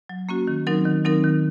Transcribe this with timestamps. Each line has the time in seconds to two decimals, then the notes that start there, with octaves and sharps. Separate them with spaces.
0.09 F#3
0.29 A#3 C#4 F#4
0.47 D#3
0.67 F#3 C4 D#4 A#4
0.85 D#3
1.05 F#3 C4 D#4 A#4
1.24 D#3